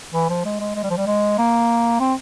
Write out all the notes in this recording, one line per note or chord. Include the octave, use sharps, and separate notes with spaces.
E3
F3
G#3
G#3
G#3
G3
F3
G3
G#3
A#3
C4